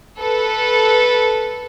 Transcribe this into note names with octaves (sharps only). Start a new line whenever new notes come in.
A4 B4